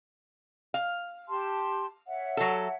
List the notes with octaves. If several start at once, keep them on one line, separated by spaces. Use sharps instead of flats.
F5
G4 A5 C6
C#5 E5 F#5
F#3 A4